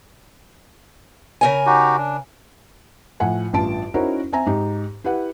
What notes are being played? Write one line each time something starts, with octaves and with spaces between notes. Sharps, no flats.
C#3 A#4 G#5
D#4 F#4 G4
D4
A2 F3 F#5 G#5
A1 G2 F4 A5 D7
C#4 D#4 E4 F#4 A#4 C5
C4 E5 G#5 A#5
G#2 D#4 G4
E4 G4 B4 F#5